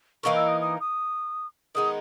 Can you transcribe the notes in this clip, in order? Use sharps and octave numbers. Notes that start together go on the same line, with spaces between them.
E3 A#3 D#4 A#4 C#6
E6
D#6
D#6
D#6
D#3 G#3 B3 D#4 D#6